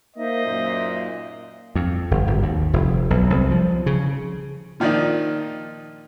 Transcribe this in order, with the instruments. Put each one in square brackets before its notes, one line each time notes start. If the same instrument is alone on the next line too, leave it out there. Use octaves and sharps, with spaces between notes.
[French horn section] A#3 [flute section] D#4 C5 E5 [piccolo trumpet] D#5
[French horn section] F#2 A#2
[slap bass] F2
G1
G#1
D#2
F1
B1
C2
F3
C#3
[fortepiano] A#2 D#3 F3 D4 D#4